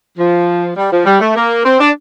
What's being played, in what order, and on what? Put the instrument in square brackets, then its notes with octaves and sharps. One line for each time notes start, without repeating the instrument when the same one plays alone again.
[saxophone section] F3
G3
F3
G3
A3
A#3
C4
D4